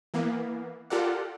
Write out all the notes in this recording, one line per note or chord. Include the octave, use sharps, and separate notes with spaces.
E3 A#3 B3
F4 G4 A4 A#4 D5 F#5